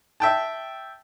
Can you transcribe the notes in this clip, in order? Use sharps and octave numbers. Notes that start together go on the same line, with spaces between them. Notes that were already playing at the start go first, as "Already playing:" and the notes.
E5 G5 A5